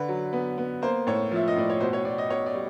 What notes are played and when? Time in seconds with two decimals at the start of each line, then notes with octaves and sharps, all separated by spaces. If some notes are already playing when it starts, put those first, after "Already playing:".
Already playing: D3 B4
0.08 F#3
0.33 B3
0.58 B3
0.82 A#3 C5
1.07 A2 C#5
1.31 F3 E5
1.48 D#5
1.56 A2 D5
1.70 C#5
1.80 B2 C5
1.93 C#5
2.05 B2 D5
2.18 D#5
2.30 B2 C#5
2.46 D5
2.55 G3